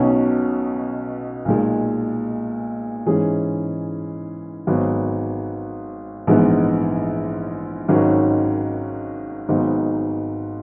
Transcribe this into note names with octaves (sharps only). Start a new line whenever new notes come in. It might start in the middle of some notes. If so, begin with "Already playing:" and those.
Already playing: B1 B2 F#3 C#4
B1 A#2 G#3
G#2 E3 G#3 C#4 G#4
G#1 G#2 F#3 B3
A#1 G#2 E3 G#3 B3
G#1 G#2 D#3 F#3 C#4
G#1 G#2 F#3 B3 D#4